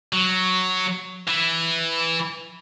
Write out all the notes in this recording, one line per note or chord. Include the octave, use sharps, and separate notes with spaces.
F#3
E3